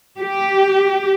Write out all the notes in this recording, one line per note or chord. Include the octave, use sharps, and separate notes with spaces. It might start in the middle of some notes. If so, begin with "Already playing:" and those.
G4